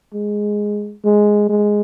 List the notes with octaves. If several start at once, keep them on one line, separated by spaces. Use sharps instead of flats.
G#3
G#3
G#3